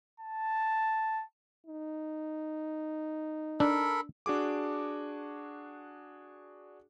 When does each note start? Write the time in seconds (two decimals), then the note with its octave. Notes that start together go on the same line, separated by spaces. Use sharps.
0.20 A5
1.67 D#4
3.60 D4 A4 A#4 B5
4.26 D4 F#4 G#4 D6